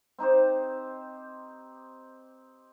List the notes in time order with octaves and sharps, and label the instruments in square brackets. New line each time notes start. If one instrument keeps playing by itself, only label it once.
[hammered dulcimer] C4 D#4 G4 C5